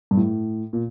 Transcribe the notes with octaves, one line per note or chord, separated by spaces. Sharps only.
G2
A2
A#2